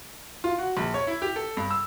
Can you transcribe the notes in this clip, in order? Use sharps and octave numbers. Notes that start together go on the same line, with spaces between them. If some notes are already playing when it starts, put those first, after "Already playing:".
F4
F#4
A#1
C#5
E4
G4
A4
G2
E6